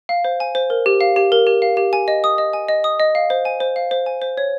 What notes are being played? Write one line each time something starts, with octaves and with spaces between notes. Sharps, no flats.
F5
C5
G#5
C5
A#4
G4
F5
G4
A#4
G4
F5
G4
G#5
D#5
D#6
D#5
G#5
D#5
D#6
D#5
F5
C5
G#5
C5
F5
C5
G#5
C5
C#5